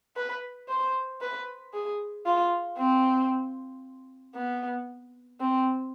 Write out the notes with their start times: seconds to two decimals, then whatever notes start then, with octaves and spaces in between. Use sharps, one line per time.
0.17 B4
0.69 C5
1.21 B4
1.73 G#4
2.26 F4
2.78 C4
4.35 B3
5.40 C4